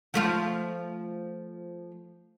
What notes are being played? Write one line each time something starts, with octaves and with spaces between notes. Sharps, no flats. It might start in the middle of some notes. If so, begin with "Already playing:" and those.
F3 A3 F4